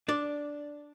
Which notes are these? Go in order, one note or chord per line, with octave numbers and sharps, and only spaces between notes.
D4 D5